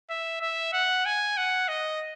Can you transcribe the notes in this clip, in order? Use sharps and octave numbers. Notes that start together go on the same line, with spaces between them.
E5
E5
F#5
G#5
F#5
D#5